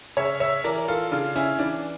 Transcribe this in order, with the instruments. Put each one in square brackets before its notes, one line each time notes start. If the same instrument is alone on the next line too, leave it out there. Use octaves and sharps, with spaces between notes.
[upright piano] C#3 C#5 E5
C#5 E5
E3 A#4 D5
F4 A4
C#3 D4 F4
C#4 E4
E3 D4